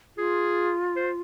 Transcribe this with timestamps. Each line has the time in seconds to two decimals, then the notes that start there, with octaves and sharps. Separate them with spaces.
0.17 F4 G#4
0.96 C5